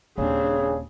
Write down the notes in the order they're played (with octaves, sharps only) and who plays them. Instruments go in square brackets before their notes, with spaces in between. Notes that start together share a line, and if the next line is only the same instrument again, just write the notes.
[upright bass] D#1 [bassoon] C#3 [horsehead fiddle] C4 D4 [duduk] G#4